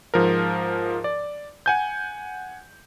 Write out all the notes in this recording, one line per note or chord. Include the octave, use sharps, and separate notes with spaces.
G#2 F3 A#4
D5
F#5 G#5 G6